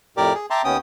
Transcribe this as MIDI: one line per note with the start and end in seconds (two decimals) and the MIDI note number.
0.17 0.33 41
0.17 0.33 45
0.17 0.33 67
0.17 0.33 70
0.17 0.33 74
0.17 0.33 86
0.34 0.46 68
0.50 0.62 76
0.50 0.62 79
0.50 0.62 81
0.50 0.62 82
0.50 0.62 84
0.50 0.62 86
0.64 0.77 39
0.64 0.77 59
0.64 0.77 61
0.64 0.77 79
0.64 0.77 87